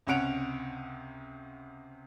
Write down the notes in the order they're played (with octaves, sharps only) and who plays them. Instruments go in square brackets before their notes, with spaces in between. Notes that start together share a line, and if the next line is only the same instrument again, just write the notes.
[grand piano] C#2 C3 C#4 F#5 D7 F7